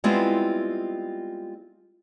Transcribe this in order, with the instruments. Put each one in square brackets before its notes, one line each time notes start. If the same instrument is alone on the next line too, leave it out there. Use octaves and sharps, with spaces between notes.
[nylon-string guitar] G3 G#3 B3 C4 E4 F4